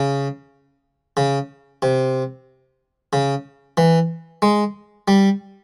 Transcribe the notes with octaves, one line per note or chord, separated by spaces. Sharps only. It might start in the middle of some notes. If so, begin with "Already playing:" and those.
Already playing: C#3
C#3
C3
C#3
E3
G#3
G3